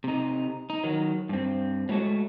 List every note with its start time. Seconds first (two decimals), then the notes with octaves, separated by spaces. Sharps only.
0.04 C3 D#4
0.70 D#4
0.84 D#3 F#3
1.29 G2 C4
1.89 F#3 G#3 A3 F#4 C#5